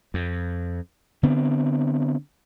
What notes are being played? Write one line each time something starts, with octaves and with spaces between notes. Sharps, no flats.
F2
D3 B3 C4